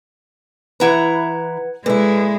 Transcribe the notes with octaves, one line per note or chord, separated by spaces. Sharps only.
E3 E4 B4 F#5 A#5 G#6
A#2 G#3 E4 A4 B4